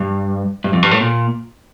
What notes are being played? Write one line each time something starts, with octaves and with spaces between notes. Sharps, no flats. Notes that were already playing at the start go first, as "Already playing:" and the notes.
Already playing: G2
G2
F2
G2
A2
A#2